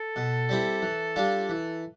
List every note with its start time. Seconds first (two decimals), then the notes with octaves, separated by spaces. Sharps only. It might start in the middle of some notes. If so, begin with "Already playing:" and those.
Already playing: A4
0.16 B2
0.49 G3 C4 E4
0.82 E3
1.16 G3 D4 F4
1.49 E3